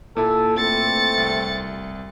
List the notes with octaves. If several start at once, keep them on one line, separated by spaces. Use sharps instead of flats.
A#2 E4 A4
A3 C4 A6 C#7
C2